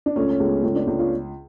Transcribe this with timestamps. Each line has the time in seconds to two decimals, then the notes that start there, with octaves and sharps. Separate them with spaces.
0.06 D4
0.16 C#2 A3 C#4
0.30 C#4
0.39 C#2 G#3 B3
0.63 C#2 A3 C#4
0.75 B3 D4
0.87 C#2
0.99 C#4 F4